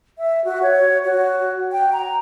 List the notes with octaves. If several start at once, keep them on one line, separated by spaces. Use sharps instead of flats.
E5
F#4
C#5
F#4
G5
A#5